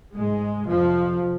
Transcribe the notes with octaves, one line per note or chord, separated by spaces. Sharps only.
G#2 G#3
F2 C3 F3